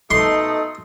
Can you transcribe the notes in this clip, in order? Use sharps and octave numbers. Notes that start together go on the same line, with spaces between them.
B2 A3 D#4 A4 C6 D#6